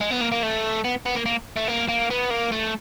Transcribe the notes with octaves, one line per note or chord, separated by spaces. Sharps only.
G#3
B3
A#3
A#3
A3
B3
B3
A#3
A#3
A3
A#3
A#3
B3
A#3
A3